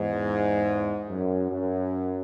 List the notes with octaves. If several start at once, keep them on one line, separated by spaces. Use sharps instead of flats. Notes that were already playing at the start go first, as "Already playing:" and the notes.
Already playing: E2 G#2
F#2
F#2